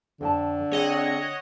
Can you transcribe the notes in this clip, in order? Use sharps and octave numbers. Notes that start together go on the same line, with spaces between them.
F2 D3 G5 A5
C4 G#4 C#5 D#5 F#5